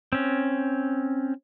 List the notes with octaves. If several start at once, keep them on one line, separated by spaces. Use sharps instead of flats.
C4 C#4